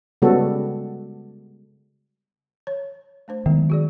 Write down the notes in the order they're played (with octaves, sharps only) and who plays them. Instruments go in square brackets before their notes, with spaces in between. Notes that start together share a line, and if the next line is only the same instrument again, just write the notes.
[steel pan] C#3 G3 G#3 B3 F#4 A4
[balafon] C#5
A3 D4 C5
[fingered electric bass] D#3 [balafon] F#3 G#3 B3
[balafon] F#4 G#4 D5